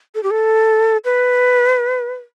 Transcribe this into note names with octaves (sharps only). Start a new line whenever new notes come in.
A4
G4
A4
B4